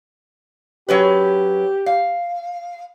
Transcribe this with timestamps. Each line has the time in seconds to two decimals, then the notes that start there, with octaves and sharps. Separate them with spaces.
0.89 F#3 C#4 G4 B4
1.86 F5